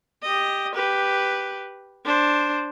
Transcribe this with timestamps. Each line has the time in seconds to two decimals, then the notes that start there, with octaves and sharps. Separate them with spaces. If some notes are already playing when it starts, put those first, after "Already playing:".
0.22 G4 D#5
0.74 G4 B4
2.05 D4 C5